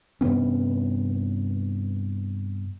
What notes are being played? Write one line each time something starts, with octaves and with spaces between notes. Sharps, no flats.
G2 C3 B3 C#4